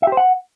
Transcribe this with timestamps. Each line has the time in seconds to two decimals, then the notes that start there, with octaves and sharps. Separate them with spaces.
0.02 E5
0.07 G4
0.12 C5
0.17 F#5